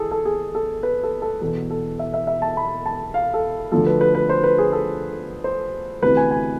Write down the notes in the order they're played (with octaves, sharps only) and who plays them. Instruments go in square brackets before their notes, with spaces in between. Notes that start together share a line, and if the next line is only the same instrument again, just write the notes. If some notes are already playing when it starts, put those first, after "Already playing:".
Already playing: [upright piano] E3 G#4 A4
A4
G#4
A4
B4
A4
A4
E2 B2 A4
A4
E5
E5
E5
A5
B5
A5
F5
A4
D2 D3 F3 A4
B4
B4
B4
C5
B4
G#4
A4
C5
D2 C3 E3 B4
G#5
G#5